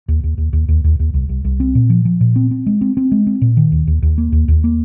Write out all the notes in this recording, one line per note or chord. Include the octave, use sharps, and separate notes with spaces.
D#2
D#2
D#2
D#2
D#2
D#2
D#2
C2
C2
C2
C4
A#2
F3
F3
A#2
C4
C4
G#3
C4
C4
G#3
C4
A#2
D#3
D#2
D#2
D#2
A#3
D#2
D#2
A#3